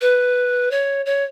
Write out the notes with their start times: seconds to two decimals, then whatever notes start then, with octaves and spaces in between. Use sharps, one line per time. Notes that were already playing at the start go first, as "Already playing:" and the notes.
0.01 B4
0.71 C#5
1.05 C#5